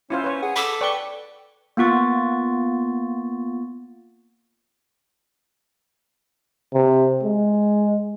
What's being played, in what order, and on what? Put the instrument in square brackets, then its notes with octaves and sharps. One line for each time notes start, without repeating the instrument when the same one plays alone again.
[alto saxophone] C#4 [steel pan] E4 F4 C5
[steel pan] B4 C#5
[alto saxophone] G#4 [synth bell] F#5
[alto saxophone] A4 [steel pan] B5 E6 [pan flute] D6
[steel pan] B4 C#6 [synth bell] D5 G5 G7
[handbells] A#3 B3 F4 C#6 A6
[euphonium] C3
G#3